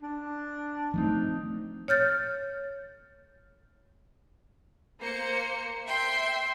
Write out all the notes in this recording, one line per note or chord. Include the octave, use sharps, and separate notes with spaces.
D4
F3 A3 C4 D#4
C#5 F6 G6 A6
A#3 C5 C#7
E5 G5 C6